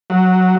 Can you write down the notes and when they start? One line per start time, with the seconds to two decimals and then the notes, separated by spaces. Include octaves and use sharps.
0.10 F#3